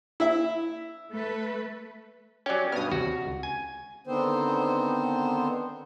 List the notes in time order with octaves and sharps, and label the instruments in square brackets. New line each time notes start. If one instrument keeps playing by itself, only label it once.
[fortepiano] E4 E5
[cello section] A3 B4
[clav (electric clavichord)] F#3 C#4 [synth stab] G4 D5
[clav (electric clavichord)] G2 B2 [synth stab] D#6 F6
[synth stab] D#2 C3 [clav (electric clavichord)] F#4
[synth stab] C#2
[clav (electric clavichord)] G#5
[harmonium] D3 D#3 B3 C4 C5